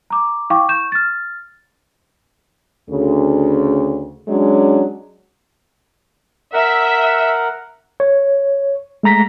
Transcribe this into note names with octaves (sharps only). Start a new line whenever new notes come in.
A#5 D6
E4 F5 G5 C#6 D6
C#6 G6 E7
F6 A6
D2 C#3
F#3 G#3 C#4 D4
A#4 E5 F#5
C#5
G#3 A3 A#5 A#6 B6